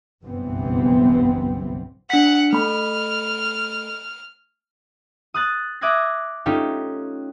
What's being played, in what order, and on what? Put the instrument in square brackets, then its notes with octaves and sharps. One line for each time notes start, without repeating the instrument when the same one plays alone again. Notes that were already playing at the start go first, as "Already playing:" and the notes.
[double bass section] F#1 B1 G2 E3 B3 C4
[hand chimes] D4 B6 [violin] F#5
[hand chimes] A3 B5 [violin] F6
[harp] D#6 F#6 A6
E5 D6 D#6 F#6 G#6 A#6
A3 C#4 D#4 F4 G4